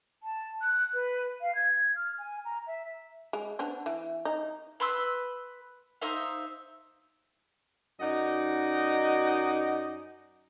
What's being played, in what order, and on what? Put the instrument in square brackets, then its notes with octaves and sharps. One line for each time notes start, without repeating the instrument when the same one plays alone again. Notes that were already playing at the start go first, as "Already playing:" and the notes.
[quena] A5
F#6
B4
F5
G#6
F6
G#5
A#5
E5
[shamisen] G#3
B3 D4 C5
E3
D#4
[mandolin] B4 C6 E6
D#4 C5 E5 F5
[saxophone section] F#2 D#4 D5 D#5 F#5